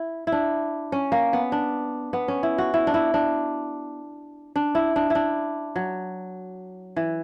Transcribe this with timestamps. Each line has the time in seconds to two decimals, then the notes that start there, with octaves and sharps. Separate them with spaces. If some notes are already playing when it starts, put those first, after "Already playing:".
Already playing: E4
0.27 E4
0.32 D4
0.92 C#4
1.12 A#3
1.33 B3
1.52 D4
2.13 B3
2.28 C#4
2.43 E4
2.58 F#4
2.74 E4
2.87 D4
2.94 E4
3.14 D4
4.56 D4
4.75 E4
4.96 D4
5.10 D4 E4
5.76 F#3
6.96 E3